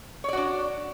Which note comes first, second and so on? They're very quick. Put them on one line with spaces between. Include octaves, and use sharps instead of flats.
C#5 D5 F#4 D4